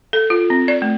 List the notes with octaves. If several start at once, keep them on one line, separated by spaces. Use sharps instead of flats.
A4
F4
C4
D5
A3